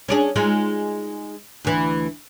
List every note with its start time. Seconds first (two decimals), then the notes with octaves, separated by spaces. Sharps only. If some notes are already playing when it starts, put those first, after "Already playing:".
0.09 C#4 D4 G#4
0.36 G#3 D#4 F4
1.65 D2 E3